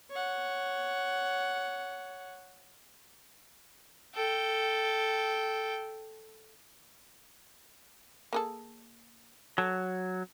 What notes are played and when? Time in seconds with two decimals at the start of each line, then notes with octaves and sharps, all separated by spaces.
0.11 C#5 F#5
4.15 A4 G5
8.33 A#3 G#4 A4
9.58 F#3 A4